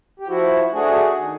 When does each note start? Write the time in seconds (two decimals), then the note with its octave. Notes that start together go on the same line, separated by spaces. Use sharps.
0.20 G4
0.28 F3 E4 F#4
0.73 A3 D4 F#4 G#4
1.18 D#3